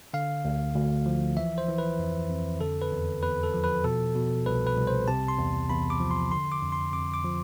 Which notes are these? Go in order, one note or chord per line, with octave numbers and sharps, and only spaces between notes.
D3 F5
D2
D2
F3
E3 E5
C5
E3
B4
F2
F2
D3 A4
B4
E2
E2 B4
A4
F3
B4
B2 A4
B2
C2 B4
B4
C2
C5
C3 A5
C6
E2
E2 B5
D6
F3
C6
D3 C6
D6
F2
C6
F2 D6
D6
F3